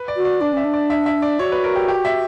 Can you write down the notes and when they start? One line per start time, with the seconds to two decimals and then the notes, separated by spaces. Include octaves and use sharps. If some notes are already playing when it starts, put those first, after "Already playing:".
Already playing: B4
0.08 D5
0.17 F#4
0.25 D5
0.41 D4 D5
0.53 C#4 E5
0.64 D4
0.74 D5
0.90 E5
1.06 E5
1.22 D5
1.39 F#4 C#5
1.52 B4
1.64 A#4
1.76 G4
1.88 G4
2.05 E5